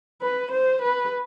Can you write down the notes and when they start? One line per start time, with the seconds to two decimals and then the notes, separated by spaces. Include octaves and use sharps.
0.22 B4
0.51 C5
0.82 B4